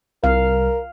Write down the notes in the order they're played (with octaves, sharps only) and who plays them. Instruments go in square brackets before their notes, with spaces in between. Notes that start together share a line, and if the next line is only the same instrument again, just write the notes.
[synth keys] C2 [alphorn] A#4 [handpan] F5